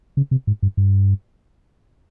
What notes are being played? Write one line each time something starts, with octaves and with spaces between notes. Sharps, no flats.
C#3
C3
G#2
G2
G2